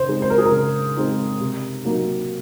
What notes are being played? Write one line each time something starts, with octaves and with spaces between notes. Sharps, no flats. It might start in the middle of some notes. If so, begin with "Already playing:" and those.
Already playing: C#3 C5
G#3 C4 D#4
C5
A#4
G#4
A#4
C#3
G#3 C4 D#4
C3
F#3 A#3 D#4